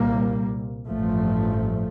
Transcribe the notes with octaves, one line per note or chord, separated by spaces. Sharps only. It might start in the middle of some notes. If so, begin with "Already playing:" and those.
Already playing: C2 A#2 G3 A#3
A1 G2 F3 A3